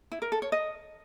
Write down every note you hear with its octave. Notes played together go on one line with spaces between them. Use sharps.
E4
A#4
A4
C#5
D#5